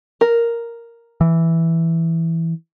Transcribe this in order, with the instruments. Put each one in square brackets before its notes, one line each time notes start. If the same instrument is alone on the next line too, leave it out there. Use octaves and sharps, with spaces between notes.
[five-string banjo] A#4
[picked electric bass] E3